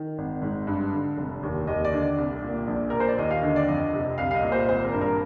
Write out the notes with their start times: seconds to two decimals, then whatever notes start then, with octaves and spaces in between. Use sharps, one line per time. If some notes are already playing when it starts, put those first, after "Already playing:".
Already playing: D#3
0.18 G#1
0.42 G#2
0.67 G2
0.93 D3
1.17 F1
1.43 D#2
1.67 D#2 D#5
1.85 D5
1.93 D3
2.01 D5
2.18 C2
2.43 A#2
2.68 A#1
2.90 A#2 A#4
3.00 C5
3.08 D5
3.18 D#2 D#5
3.31 F5
3.43 D3 D#5
3.56 D5
3.68 F2 D#5
3.94 C3
4.18 C2 F5
4.31 F5
4.35 D#5
4.43 A#2
4.52 C5
4.68 G#1 C5
4.85 A#4
4.93 G2
5.01 A#4